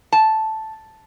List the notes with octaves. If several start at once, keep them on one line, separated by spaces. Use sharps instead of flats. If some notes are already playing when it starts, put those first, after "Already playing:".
A5